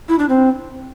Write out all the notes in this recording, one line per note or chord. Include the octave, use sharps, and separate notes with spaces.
E4
D4
C4